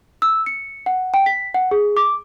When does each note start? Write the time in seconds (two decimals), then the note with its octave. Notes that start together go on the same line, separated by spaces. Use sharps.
0.22 E6
0.46 C#7
0.86 F#5
1.14 G5
1.26 B6
1.54 F#5
1.71 G#4
1.97 D6